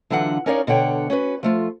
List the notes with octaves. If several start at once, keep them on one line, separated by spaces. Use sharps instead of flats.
D3 E3 F#3 D4 F4 F#5
C#4 D#4 A#4 C#5 D5 F5
B2 D3 C#5 F#5 G5
C#4 F#4 B4
F3 A3 F4